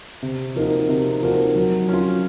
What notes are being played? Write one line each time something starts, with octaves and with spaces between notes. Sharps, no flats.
C3
F3 A#3 D#4 F#4
C3
F3 A#3 D#4 F#4
F#3
C#4 F4